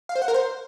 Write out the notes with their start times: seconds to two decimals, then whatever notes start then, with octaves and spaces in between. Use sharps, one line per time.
0.09 F5
0.16 C5
0.22 F#5
0.28 A#4
0.34 C5